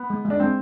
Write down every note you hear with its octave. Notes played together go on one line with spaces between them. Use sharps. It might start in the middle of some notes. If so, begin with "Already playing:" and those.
Already playing: B3
G#3
G#3
D4
G#3 C4